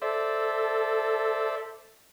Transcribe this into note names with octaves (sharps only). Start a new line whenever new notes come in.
A4 C5 D5 E5